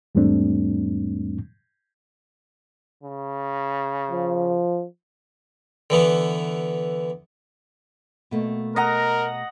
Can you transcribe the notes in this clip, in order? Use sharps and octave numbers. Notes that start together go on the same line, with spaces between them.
E2 G#2 G3 A3 C4 D4
C#3
F3
D3 E3 B3
B2 A3 A#3
A#4 D#5 F#5 A#5